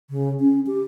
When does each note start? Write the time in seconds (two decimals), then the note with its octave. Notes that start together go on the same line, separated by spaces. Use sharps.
0.10 C#3
0.40 C#4
0.67 G4